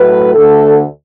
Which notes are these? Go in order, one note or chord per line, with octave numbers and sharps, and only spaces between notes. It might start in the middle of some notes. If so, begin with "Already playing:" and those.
Already playing: A2 F#3 A3 B4
D2 D3 A3 A4